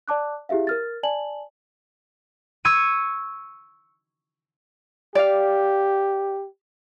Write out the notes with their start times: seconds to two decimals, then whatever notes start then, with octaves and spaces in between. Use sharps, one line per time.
0.08 D5 A5 D6 F#6
0.49 E4 G4 G#4 E5 F5
0.67 A#4 F6 A6
1.03 D5 G#5 A5 F#7
2.65 C#6 E6 G#6 C#7 D#7
5.15 G4 D5 F5